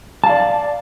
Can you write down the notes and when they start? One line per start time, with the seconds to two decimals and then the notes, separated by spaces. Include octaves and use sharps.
0.24 A5
0.27 F5
0.29 D5